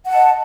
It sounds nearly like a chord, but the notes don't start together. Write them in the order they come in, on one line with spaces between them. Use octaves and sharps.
F#5 A5 D#5